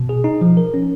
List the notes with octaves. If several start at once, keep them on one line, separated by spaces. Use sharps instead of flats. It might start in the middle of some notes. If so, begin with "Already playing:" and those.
Already playing: B2
G#4
D#4
F3
A#4
C#4